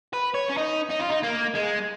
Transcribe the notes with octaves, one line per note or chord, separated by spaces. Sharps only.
B4
C#5
C#4
D#4
D#4
F4
D#4
A#3
G#3